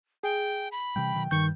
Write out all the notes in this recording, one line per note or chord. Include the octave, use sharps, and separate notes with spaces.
G#4 G5
B5
C3 E3 G3 G5
B2 D#3 F#3
G2 D#3 G3 C#6 G6